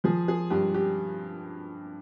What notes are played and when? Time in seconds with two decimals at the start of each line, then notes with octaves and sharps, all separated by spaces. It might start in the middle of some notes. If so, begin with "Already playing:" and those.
0.04 F3 G#4
0.28 G#4
0.50 G2 G4
0.74 G4